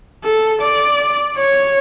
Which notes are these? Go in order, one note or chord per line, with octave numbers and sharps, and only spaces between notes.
A4
D5
C#5